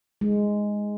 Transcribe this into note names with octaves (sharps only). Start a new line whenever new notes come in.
G#3